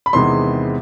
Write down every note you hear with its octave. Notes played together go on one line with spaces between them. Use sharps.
B5
E2 C3 D#3 G#3 B3 C6